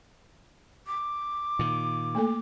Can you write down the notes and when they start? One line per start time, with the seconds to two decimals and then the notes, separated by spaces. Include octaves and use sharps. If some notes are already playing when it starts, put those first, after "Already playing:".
0.87 D6
1.59 A#2 D#3
2.15 A3 A#3 A4